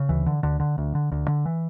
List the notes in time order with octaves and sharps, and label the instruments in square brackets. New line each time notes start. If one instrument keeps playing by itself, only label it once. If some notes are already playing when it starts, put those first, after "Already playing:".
Already playing: [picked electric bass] C#3
D2 E3
D3
D2 D3
D3
D2
D3
D2
D3
E3